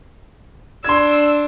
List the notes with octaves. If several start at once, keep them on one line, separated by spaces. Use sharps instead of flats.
D4 C6 E6 G#6